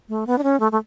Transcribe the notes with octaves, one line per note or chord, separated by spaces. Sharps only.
A3
B3
D4
C#4
A3
A3